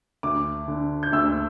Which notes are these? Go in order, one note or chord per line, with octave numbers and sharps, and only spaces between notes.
D2 D6
D3
G6
D2 E6